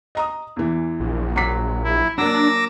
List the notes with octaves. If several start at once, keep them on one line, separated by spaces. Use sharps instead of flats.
D#5 A#5 D#6
E2 E3
A#1
F#3 D6 B6
E4
F#3 A#3 D4 D6 E6 A#6